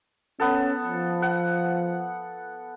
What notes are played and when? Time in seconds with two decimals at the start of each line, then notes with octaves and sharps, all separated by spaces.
0.40 B3 C#4 A4
0.83 F3
1.22 F#5